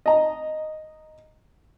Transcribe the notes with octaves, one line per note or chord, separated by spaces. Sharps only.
D#5 A#5